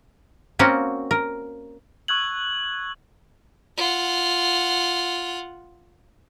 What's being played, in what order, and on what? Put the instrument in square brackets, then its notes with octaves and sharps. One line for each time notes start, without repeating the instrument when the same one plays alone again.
[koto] A#3 C4 C#4 F#4 A#4
A#4
[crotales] C#6 E6 F#6 G#6 F#7
[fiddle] F4 F#5